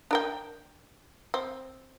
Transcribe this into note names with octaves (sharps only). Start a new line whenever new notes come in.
D4 A#4 G5
C4